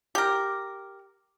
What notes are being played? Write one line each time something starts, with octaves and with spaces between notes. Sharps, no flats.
G4 A#4